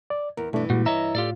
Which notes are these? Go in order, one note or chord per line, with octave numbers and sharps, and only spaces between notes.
D5
E2 A#4
G2 B2 E3 A3 D4
A#2 G3 G#3 F#4
C#5 D#5 E5 A#5
A2 F4 G4 A4 D5